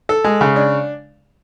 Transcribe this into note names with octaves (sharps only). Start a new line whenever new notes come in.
A4
G#3
C#3
D4